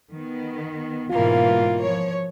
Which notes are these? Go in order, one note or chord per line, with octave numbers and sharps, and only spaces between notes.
D#3 B3
G#2 B2 E3 A#3 B3 F4
F3 C#5